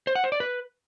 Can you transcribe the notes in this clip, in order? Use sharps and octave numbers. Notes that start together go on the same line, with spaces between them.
C5
F#5
C5
D5
B4